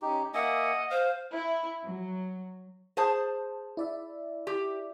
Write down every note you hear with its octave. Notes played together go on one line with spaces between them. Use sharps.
C#4 D#4 G4
A#3 D#5 E5 F#5 G#5
C5 F5
E4
F#3
G#4 C5 A5
E4 D5 E5
G4